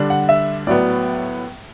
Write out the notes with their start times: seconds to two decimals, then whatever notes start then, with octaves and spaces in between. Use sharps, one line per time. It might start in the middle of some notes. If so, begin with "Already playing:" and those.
Already playing: D3 G3 D4
0.10 F#5
0.29 E5
0.67 A2 F#3 B3 D5